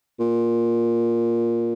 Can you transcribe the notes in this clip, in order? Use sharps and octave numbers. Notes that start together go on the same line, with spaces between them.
A#2